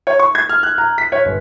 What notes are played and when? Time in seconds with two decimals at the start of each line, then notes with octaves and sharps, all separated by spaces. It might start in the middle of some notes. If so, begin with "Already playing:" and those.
0.07 C#5
0.19 C#6
0.35 G#6
0.49 F6
0.63 F#6
0.78 A#5
0.98 B6
1.12 C#5
1.25 G1